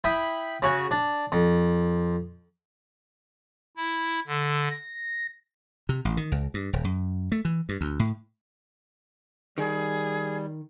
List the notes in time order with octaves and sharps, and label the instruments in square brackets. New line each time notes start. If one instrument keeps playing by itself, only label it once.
[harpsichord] E4 G5 B5 D#6
C#3 F#4 G#5
D4
F2
[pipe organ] E4
D3
A#6
[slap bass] C3
A1
D#3
C#2
G2
D#1
F#2
A3
E3
G2
D2
A2
[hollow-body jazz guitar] D#3 [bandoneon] G3 [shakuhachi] G#4